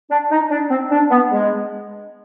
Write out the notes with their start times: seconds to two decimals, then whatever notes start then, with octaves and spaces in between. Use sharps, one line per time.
0.11 D4
0.31 D#4
0.51 D4
0.71 C4
0.91 D4
1.11 B3
1.31 G#3